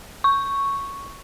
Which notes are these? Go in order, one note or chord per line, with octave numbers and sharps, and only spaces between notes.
C#6